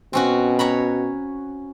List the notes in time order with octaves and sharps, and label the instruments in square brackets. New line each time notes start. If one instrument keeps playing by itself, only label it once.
[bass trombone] B2 [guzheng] C4 C#4 F#4
[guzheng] C#5 A#5 B5